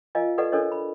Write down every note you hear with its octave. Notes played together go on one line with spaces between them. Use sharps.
F4 A#4 D#5 F5 G#5
G4 A4 B4 D5 D#5 F#5
D4 A4 A#4 C#5 D#5
B5